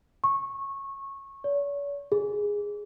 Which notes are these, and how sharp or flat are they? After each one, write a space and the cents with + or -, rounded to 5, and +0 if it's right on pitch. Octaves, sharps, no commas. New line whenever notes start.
C#6 -20
C#5 +45
G#4 -5